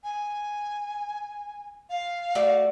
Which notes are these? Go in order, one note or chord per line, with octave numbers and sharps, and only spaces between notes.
G#5
F5
A3 F#4 D5